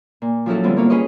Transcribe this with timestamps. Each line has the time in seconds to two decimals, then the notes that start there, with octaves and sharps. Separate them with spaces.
0.22 A#2
0.46 F3 F#3 C#4 E4 F#4 A4
0.63 D3 G3 B3 C4 E4 F4
0.77 A#3 C#5 F5
0.90 C#4 G#4 B4 C#5 D#5